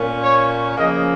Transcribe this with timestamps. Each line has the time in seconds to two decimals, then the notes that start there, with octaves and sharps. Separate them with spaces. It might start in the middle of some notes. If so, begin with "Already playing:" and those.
Already playing: A#2 A#3 C#4
0.20 C#5
0.77 C#3 F3 A#3 C#4 D#5